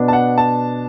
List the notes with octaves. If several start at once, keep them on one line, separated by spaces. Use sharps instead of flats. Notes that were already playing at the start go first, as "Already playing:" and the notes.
Already playing: B2 B3 D4
A5
F#5
A5